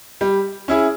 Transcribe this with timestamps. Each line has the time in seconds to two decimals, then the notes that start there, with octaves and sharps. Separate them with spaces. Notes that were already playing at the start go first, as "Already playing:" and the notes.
0.21 G3
0.68 C#4 E4 G#4